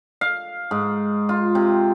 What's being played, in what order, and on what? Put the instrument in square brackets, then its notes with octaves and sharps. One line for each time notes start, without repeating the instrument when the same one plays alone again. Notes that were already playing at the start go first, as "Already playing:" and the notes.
[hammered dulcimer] F5
G#2
F4
C3